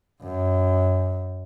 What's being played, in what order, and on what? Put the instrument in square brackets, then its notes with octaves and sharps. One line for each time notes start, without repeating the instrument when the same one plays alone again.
[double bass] F#2